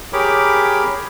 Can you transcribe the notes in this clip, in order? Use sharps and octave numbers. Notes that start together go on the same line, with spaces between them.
G4 G#4 A#4 C#5 B5 D6